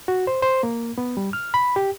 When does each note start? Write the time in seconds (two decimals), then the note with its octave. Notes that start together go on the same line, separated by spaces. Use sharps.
0.08 F#4
0.27 C5
0.42 C5
0.63 A#3
0.98 B3
1.17 G3
1.33 F6
1.54 B5
1.76 G4